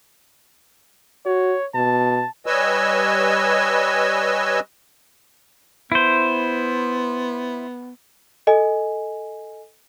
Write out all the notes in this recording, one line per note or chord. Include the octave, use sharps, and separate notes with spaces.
F#4 C#5
B2 A5
G3 B4 C#5 D#5 G#5 E6
B3 E4 C5
A4 D#5 G#5